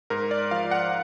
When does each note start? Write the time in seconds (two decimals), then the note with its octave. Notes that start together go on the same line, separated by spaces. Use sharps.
0.10 G#2 A#4
0.31 D5
0.51 F3 F5
0.71 F#5